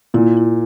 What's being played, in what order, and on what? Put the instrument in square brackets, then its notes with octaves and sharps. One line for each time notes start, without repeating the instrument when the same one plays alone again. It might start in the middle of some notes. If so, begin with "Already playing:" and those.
[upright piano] A#2 [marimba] E4
[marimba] E4